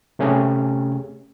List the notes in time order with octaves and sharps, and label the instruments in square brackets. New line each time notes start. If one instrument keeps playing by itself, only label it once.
[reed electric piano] C3 A3 C#4 G4 G#4